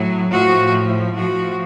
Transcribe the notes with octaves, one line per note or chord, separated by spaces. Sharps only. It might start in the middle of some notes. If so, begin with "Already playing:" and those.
Already playing: A2 F#3
A2 F3 F#4
A2 F3 F#4